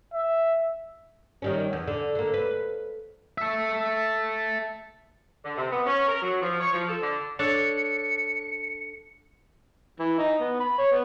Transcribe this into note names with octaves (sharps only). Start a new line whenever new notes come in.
E5
D#3 G3 C#4
E2
D3
D3 A#3
B4
A4 E5
D3
C3
B3
C#4
A#4
F#3
F3
C#5
F3
A4
D3
D4 A4 C#5 C#7
E3
D#4
B3
B5
C#5
B3